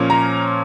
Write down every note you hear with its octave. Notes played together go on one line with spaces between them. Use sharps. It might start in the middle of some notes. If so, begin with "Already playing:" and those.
Already playing: A#2 F3 A#3 C#4
A#5